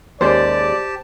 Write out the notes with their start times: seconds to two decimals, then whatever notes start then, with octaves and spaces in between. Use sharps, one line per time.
0.21 D#2 C#3 G#3 G4 C5 D5 A5